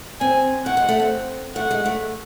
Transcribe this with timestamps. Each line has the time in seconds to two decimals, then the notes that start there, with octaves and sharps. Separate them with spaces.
0.21 C4 G#5
0.66 A3 F#5
0.77 G#3
0.89 A3
1.00 C4
1.56 A3 F#5
1.71 G#3
1.86 A3